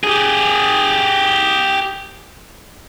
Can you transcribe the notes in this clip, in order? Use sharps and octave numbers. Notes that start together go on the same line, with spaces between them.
G4 G#4